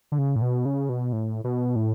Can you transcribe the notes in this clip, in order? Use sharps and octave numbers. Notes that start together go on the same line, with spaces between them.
D3
C#3
A2
B2
C#3
B2
A2
B2
A2